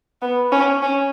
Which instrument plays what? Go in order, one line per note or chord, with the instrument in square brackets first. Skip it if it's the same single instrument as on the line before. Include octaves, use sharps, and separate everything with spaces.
[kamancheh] B3
C#4
C#4